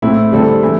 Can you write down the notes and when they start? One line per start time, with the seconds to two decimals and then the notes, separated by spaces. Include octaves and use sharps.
0.02 A2 A3 C4 E4
0.32 D3 G3 C4 A4
0.63 E3 A3 E4